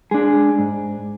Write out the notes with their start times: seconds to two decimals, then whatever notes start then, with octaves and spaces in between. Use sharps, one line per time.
0.11 G#3 D4 G#4
0.58 G#2